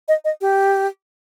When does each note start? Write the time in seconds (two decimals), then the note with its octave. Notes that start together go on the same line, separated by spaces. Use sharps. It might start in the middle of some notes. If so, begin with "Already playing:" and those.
0.08 D#5
0.25 D#5
0.41 G4